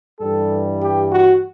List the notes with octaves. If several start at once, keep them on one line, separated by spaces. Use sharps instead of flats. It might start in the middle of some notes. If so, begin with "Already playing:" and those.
G2 E3 G3 A4
G4
F#4